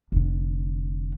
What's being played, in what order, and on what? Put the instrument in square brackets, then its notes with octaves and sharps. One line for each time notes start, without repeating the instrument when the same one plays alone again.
[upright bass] F1 D3